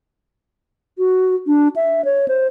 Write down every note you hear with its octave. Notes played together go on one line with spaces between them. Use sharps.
F#4
D4
E5
C#5
C5